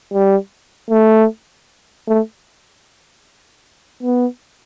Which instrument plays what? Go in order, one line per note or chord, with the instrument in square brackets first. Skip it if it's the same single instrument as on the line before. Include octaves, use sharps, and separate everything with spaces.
[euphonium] G3
A3
A3
B3